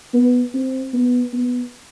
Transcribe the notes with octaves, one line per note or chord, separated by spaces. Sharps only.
B3
C4
B3
B3